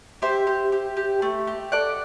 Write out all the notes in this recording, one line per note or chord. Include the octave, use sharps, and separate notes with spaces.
G4 C5 E5
G4
G4
G4
A3
G4
A4 D5 F#5